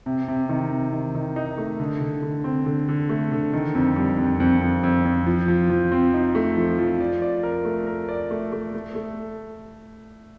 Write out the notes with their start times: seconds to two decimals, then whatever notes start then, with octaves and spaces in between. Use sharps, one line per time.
0.06 C3
0.28 C3
0.49 D#3
0.71 C3
0.92 D#3
1.15 D#3
1.36 D#4
1.58 A3
1.80 D3
2.01 D3
2.22 D3
2.44 C4
2.66 D3
2.88 D3
3.09 A3
3.32 D3
3.53 D#3
3.75 F2
3.96 G3
4.18 F2
4.40 F2
4.62 F2
4.83 F2
5.05 F2
5.26 F3
5.48 F3
5.70 F3
5.92 C4
6.14 D#4
6.35 A3
6.56 F3
6.79 F3
7.00 D5
7.22 D5
7.43 A#4
7.65 A3
7.87 A#4
8.09 D5
8.31 A3
8.52 A3
8.74 A3
8.95 A3